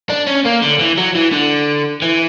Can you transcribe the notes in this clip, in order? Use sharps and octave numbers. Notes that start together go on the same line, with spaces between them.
D4
C#4
A#3
D3
E3
F#3
E3
D3
E3